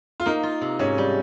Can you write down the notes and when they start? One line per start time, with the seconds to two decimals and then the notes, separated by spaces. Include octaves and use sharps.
0.20 F4
0.26 A#3 D#4
0.43 F4
0.61 C3
0.79 G#2 C#4
0.98 G3